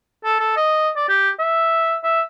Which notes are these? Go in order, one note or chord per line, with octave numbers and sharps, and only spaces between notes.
A4
A4
D#5
D5
G4
E5
E5